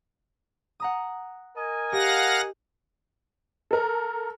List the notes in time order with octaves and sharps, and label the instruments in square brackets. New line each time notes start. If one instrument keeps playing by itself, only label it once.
[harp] F#5 A#5 D#6
[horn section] A#4 D#5 G#5
[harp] G4 [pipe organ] F5 F#5 A#6
[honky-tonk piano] A4 A#4